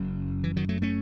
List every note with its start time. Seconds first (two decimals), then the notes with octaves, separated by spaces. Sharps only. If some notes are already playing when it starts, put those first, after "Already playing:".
Already playing: F#1 F#2 C#3
0.44 E3
0.56 D#3 F#3
0.69 F#3 A3
0.82 A3 C#4